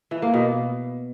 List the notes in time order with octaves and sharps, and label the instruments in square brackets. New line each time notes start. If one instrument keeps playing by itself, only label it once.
[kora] E3
A#3
B2